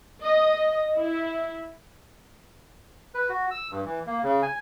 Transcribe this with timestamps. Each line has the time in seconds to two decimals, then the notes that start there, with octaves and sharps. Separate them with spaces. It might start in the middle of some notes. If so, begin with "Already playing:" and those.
0.23 D#5
0.96 E4
3.14 B4
3.29 F#4
3.51 E6
3.72 G2
3.85 E3
4.07 A#3
4.23 C#3
4.43 G#5